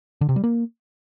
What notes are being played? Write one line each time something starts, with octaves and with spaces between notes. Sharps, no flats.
D3
C3
G3
A#3